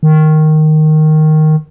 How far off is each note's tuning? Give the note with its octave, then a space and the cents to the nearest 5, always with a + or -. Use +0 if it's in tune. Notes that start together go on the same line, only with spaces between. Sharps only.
D#3 -5